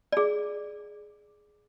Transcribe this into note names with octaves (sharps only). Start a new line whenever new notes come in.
G#4 D5